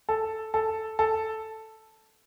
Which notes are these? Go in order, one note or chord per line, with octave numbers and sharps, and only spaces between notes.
A4
A4
A4